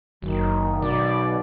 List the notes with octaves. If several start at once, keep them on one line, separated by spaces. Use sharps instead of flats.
F#1 D#3 F#3
B1 B2 D5